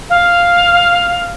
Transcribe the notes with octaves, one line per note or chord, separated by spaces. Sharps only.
F5